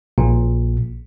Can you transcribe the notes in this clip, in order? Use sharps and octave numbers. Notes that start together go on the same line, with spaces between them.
A#1 A#2